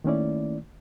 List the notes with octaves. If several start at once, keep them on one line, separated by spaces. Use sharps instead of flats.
D#3 A3 A#3 C#4 E4 D5